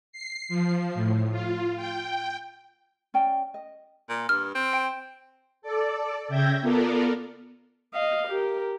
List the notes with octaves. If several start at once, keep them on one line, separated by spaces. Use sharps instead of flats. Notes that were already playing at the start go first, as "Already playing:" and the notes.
C7
F3
A2
F4
G5
C#4 D5 G5 A5
D#5
A#2
G2 F6
C4
G5
A4 D5
C#3 E5 G5 G6 G#6 A#6
B3 F4 A4 A#4 D5
D#5 F5
G4 A#4